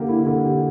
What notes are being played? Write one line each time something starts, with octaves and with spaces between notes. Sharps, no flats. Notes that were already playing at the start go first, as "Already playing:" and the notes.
Already playing: D3 A#3 G4
E4
D3
G4